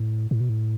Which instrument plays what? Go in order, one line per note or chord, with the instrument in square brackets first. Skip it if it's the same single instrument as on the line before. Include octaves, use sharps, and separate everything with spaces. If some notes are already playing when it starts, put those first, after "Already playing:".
Already playing: [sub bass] A2
A2
B2
A2